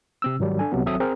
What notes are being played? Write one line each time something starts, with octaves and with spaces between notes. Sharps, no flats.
C3 C4 E6
G#2 D#3 F#3 G3
D4 A4 G#5
C2 C3 F#3 B3
G#1 F#3 C4 A4 E5 D#6
C4 G#4 A#4 C5